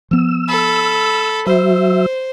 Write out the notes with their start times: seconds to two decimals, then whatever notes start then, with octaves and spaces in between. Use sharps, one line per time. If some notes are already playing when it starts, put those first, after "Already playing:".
0.11 F3 B3 E6
0.48 A4 B5
1.47 F#3 C5 E5